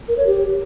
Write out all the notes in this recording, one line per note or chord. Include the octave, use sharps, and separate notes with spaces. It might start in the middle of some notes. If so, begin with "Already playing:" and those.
A#4
C#5
G4